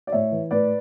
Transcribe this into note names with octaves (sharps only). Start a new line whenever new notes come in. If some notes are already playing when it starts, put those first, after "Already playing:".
D5
A2 C#5 E5
E3
A2 B4 D5